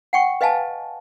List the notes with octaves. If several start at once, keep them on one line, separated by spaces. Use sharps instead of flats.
F#5 G5 C#6
B4 D#5 F5 G#5 A5